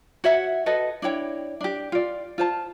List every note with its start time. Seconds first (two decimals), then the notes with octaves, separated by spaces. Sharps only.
0.24 F#4 C#5 E5 F#5
0.66 F#4 A4 B4 D#5
1.02 D4 E4 C#5 G5
1.61 D4 G4
1.92 F4 D5
2.38 F4 C5 A5